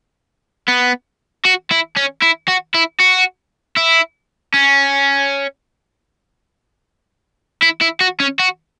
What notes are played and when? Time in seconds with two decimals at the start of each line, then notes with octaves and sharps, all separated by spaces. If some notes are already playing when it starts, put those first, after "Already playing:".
0.68 B3
1.45 F#4
1.71 E4
1.97 C#4
2.22 E4
2.48 F#4
2.74 E4
3.00 F#4
3.77 E4
4.54 C#4
7.62 E4
7.81 E4
8.01 F#4
8.20 C#4
8.39 F#4